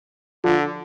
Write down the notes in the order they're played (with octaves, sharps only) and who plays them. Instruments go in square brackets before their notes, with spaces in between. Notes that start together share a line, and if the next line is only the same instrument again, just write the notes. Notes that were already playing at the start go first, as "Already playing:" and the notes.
[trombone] D3 [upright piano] F3